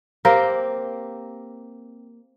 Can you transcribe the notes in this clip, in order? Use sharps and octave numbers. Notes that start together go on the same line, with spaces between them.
A#3 C4 G4 A#4